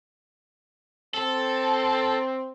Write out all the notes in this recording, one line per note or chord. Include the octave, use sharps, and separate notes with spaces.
C4 A4